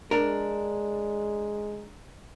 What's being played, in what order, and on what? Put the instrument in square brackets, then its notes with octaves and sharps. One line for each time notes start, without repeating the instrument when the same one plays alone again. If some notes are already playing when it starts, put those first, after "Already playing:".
[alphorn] G#3 [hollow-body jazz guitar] D4 A#4